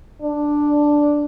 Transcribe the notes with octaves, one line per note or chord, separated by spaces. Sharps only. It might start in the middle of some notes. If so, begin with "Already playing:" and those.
D4